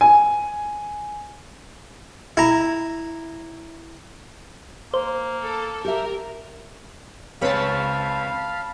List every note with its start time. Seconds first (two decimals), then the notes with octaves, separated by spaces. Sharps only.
0.01 G#5
2.37 E4 A#5
4.94 A#3 C5
5.45 A4
5.85 G4 A#4 E5
7.41 C#2 C#3 C4 B4 C#5 F5 A5 B5